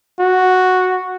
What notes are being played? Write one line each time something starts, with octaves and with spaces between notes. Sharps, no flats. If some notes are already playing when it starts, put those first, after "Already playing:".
F#4